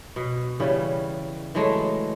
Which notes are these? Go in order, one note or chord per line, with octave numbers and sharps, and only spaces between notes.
B2
C#3 E3 G3 C#4
E3 F#3 G#3 A3